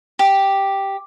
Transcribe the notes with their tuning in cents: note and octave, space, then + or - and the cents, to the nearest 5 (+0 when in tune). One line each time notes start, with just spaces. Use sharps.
G4 +0